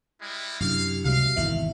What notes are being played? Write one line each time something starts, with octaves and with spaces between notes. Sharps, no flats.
G3 G#3 E4
F#2 C3 D4 E4 G4 F5
C#2 C3 G3 F#4 F5
G#1 E2 D#3 E4 E5